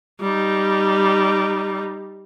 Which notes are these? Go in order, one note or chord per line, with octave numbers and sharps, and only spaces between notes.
G3 D#4